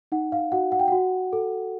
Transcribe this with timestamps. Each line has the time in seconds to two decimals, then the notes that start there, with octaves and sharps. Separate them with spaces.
0.12 D#4 F#5
0.32 F5
0.52 F#4 F#5
0.72 F#5
0.79 G5
0.88 F#4 F#5
1.33 A4